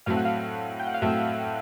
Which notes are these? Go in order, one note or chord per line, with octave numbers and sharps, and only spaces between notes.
A2 F#3 A3 C4 F5
F#5
F5
G5
F#5
F5
A2 F#3 A3 C4 E5